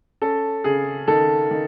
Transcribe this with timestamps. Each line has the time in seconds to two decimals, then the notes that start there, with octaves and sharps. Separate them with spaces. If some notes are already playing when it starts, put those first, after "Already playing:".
0.22 C#4 A4
0.64 C#3 G#4
1.08 D#3 A4
1.51 D#3